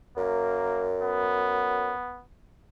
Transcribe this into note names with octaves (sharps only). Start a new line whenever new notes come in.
F#2 A#3
B3